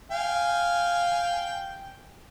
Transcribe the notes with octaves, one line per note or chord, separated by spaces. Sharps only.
F5 G5 G#5